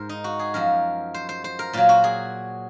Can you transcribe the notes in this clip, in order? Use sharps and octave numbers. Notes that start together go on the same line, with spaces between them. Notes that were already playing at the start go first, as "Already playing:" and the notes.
Already playing: G#2 A#4 C5
D#4
F#4
G#4
F#2 F3 A#4
C5
C5
C5
A#4
A#2 F#3 F4
F#4
G#4